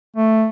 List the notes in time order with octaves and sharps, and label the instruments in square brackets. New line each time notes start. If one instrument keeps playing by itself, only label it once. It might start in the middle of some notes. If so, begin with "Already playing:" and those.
[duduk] A3